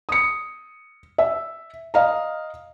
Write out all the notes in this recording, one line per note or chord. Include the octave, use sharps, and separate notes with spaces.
D#6 C#7
E5
D#5 F5 A#5